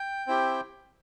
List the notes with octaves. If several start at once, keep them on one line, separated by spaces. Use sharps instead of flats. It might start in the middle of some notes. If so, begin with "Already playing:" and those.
Already playing: G5
C4 E4 G4